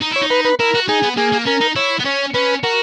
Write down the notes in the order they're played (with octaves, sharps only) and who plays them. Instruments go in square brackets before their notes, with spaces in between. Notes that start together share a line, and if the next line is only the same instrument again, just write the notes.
[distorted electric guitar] D#4
[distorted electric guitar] E4 [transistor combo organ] C#5
[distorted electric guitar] D#4
[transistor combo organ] B4
B4
[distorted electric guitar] E4 [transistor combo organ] A#4
[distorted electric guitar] F#4
[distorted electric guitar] D#4 [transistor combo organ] G#4
[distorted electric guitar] B3
[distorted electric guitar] A#3 [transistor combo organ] G#4
[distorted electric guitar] A#3
[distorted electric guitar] C#4 [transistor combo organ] A#4
[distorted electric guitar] D#4
[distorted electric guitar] E4 [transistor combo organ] C#5
[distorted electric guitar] B3
[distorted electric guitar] C#4 [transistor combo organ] C#5
[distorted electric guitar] C#4 [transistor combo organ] B4
[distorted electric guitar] F#4 [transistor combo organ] A#4